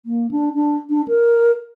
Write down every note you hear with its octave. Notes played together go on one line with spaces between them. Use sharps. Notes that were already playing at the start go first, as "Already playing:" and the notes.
A#3
D4
D4
D4
A#4